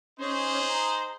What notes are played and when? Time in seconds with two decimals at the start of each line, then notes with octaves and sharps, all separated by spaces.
0.19 C#4 D#4 G#4 C5
0.69 A#5